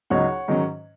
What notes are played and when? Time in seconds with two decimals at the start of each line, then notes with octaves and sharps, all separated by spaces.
0.10 C#2 C#3 F#3 D#4 C#5 F#5
0.48 G#2 D#3 F#3 C#4